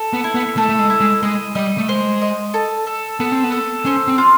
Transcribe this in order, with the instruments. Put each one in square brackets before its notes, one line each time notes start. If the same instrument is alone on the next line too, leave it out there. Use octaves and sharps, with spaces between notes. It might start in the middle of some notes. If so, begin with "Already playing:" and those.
Already playing: [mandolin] A4
[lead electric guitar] B3
[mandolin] E4
[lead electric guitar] B3
[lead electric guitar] A3 [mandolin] A4
[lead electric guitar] A3
G#3
[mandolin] E4
[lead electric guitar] G#3
[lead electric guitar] G#3 [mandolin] D#5
[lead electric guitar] G3 [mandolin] D#5
[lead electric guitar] A3
[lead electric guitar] G#3 [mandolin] C5
[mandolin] D#5
A4
A4
[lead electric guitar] B3 [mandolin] A4
[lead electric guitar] C4
B3
[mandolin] A4
[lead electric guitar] C#4 [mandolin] C5
[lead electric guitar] C4
[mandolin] F4